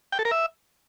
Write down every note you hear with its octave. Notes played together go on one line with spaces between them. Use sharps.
G5
A4
A#4
E5